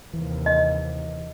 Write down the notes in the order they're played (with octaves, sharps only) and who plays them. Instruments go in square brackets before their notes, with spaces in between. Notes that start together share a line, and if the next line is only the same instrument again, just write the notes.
[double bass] D#2 C3 [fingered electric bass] E3
[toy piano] D#5